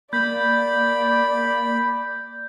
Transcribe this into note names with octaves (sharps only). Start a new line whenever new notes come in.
A#3 D5 B5 G6